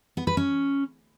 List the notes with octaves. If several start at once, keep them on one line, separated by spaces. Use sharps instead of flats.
B3
B4
C#4